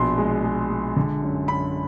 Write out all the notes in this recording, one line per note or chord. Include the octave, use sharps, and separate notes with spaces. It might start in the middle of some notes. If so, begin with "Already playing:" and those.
Already playing: A#1 B2 C6
G#3
G#3
G#3
D3
F#2
F#2 B5